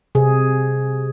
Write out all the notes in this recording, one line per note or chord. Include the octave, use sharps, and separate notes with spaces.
C3 G#4